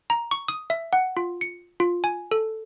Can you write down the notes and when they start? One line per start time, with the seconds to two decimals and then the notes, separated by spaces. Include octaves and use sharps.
0.10 A#5
0.31 C#6
0.48 D#6
0.70 E5
0.93 F#5
1.17 F4
1.41 C#7
1.80 F4
2.04 G#5
2.31 A4